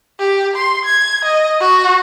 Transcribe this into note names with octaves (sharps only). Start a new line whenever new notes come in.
G4
C6
G#6
D#5
F#4